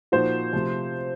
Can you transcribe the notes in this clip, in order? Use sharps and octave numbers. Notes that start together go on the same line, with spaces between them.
A#2 F3 A#3 D#4 F#4 C5
C3 F3 A3